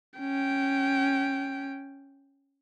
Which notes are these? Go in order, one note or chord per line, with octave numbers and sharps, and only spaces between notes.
C#4 G5